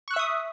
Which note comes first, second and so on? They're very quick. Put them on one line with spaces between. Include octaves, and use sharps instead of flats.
C#6 F#6 E6 E5 D#6